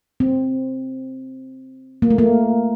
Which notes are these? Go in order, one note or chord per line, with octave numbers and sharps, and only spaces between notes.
C4
A#3
A3
A#3